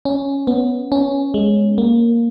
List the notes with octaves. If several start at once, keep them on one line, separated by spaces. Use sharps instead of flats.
C#4
B3
C#4
G#3
A#3